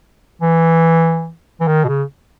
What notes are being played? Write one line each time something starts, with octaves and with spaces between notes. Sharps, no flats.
E3
E3
D#3
B2
C#3